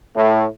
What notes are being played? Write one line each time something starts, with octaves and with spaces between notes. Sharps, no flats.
A2